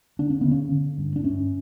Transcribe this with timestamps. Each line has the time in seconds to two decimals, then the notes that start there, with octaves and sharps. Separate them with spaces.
0.19 D3 D4
0.30 C#4
0.41 D3 B3
0.51 C#4
0.72 D3
0.98 G2
1.16 D4
1.24 G2 C#4